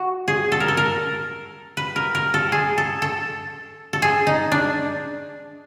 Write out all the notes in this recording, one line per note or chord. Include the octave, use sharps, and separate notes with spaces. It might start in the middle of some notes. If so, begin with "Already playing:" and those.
Already playing: F#4
G#4
A4
A#4
A4
A#4
B4
A#4
A#4
A4
G#4
A4
A4
A4
G#4
D#4
D4